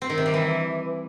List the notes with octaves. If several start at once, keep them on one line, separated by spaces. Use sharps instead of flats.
C4
D#3
C3
G3
E3